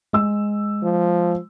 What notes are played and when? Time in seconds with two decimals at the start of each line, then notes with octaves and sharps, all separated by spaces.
0.13 G#3 E6
0.83 F3